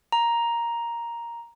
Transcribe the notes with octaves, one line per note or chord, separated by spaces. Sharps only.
A#5